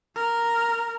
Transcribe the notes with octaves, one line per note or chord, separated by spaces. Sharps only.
A#4